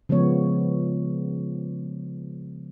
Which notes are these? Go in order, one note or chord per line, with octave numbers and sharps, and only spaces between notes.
C#3 F3 G#3 B3 C#5